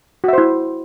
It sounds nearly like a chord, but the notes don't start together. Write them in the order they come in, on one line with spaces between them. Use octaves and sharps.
F#4 E5 C5 E4